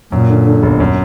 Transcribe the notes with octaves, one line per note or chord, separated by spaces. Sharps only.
F#2 A#2
D3
D3
G1
F#2